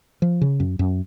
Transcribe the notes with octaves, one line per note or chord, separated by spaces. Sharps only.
F3
C#3
F#2
F#2